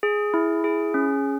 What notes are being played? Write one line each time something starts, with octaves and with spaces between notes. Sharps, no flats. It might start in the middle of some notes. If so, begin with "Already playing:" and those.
G#4
E4
G#4
C#4